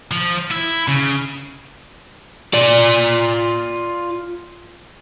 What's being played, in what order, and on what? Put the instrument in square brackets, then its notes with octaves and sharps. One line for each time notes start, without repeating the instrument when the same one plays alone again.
[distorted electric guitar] F3
E4
C#3
[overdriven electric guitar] F4 D5